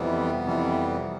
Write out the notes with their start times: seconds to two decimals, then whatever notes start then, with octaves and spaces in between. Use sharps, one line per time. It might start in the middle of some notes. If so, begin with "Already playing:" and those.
Already playing: F2 C3 E3 G3 B3
0.43 F2 C3 E3 G3